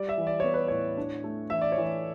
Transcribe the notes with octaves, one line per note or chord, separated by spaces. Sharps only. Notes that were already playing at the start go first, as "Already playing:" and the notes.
Already playing: G3 D5
E5
E3
D5
B3 C#5
B4
A2 C#5
D4
A3
E3 E5
D5
C#5
E3
D5